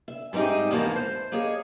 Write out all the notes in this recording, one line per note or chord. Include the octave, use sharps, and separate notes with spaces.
E5
G#2 G3 C4 D#4 G#4
E2 G#2 E3 F3 A#3 A5
C5
A#3 G#4 C#5 D#5